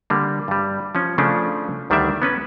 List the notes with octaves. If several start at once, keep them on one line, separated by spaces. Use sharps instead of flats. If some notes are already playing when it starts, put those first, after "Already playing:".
D3 G3 A#3
G2 G3
F3 C#4
C#3 F3 A3 C#4 D4
D2 D#3 G3 D4 D5 E5
B3 C#4 B4